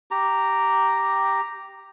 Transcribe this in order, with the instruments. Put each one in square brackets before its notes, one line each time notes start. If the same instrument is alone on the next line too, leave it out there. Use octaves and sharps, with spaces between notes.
[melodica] G4 A#5